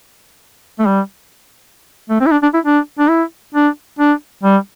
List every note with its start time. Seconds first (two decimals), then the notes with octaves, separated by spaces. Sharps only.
0.79 A3
0.87 G3
2.10 A3
2.20 C4
2.26 E4
2.32 D4
2.43 D4
2.54 E4
2.65 D4
2.99 D4
3.09 E4
3.55 D4
3.99 D4
4.43 G3